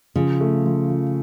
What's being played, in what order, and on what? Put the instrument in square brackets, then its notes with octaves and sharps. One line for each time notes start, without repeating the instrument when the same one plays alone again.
[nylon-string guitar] C#3 [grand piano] F3
[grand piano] A3
F3
F3